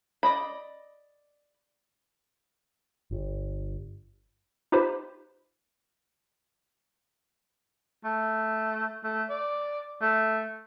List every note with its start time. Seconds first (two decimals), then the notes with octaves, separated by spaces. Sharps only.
0.23 D5 D#5 B5
3.11 G1
4.72 D#4 F4 G4 B4 C5 B5
8.04 A3
9.04 A3
9.30 D5
10.02 A3